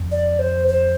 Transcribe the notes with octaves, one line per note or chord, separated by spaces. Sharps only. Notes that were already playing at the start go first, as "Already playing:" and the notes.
Already playing: F2
D5
C5
C5